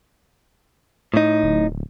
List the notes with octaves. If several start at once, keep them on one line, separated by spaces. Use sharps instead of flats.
A2 D#4
D1